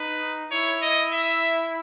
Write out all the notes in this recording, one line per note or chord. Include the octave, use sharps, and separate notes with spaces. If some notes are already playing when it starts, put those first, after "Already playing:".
Already playing: D#4 B4
E4 C#5
D#5
E5